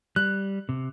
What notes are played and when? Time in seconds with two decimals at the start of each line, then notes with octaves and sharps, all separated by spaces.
0.16 G3 F#6
0.69 C3